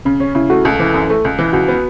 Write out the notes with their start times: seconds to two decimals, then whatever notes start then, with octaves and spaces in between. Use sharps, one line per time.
0.05 C#3 C#4
0.20 C#4
0.35 C#3 E4
0.50 A3 F#4
0.65 C#2 A4
0.80 E3
0.94 F#2
1.10 A3
1.25 C#2
1.39 E3
1.53 C#2 F#4
1.68 B3